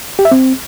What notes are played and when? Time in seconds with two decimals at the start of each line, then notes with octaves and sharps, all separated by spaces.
0.19 G4
0.25 E5
0.31 C4